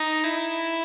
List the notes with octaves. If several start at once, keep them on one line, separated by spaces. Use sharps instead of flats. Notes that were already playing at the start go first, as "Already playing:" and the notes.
Already playing: D#4
E4